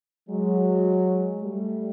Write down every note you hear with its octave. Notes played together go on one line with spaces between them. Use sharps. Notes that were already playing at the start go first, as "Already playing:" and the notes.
F#3 G#3
G3 A3